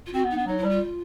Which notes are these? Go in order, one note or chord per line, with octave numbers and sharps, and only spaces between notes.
F4
C4 F#4
B3
D#4
B3 D4
F#3 D#4
E4
G3
F4